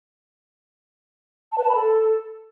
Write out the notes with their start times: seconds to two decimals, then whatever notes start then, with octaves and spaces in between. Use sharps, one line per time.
1.52 A5
1.58 B4
1.63 A5
1.69 B5
1.75 A4